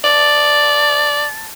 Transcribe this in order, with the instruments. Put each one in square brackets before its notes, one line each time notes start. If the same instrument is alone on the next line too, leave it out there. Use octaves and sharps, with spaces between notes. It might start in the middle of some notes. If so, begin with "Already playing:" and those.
[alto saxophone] D5 [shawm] A5